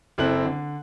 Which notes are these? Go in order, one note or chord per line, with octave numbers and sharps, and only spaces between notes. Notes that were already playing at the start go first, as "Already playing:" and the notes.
F#1 C4 E4 A4 F#6 F#7
D3